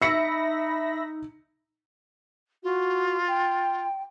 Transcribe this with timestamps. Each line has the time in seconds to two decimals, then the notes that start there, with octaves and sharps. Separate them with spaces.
0.02 D#4 E5 B5 E6 A#6 C#7
2.63 F4 F#4
3.28 G5